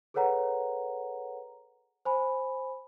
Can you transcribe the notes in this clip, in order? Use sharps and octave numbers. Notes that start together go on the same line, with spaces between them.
G#4 A4 B4 C#5 F#5 A#5
C5 G#5 B5